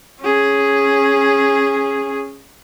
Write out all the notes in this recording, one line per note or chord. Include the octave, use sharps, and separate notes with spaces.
C#4 G#4